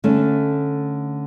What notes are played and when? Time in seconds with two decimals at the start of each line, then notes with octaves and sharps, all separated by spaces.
0.04 D3 A3 C#4